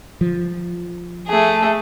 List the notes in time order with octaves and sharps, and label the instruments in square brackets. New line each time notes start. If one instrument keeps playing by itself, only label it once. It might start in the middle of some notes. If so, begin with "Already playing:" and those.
[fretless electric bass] F3
[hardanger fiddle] A3 G#4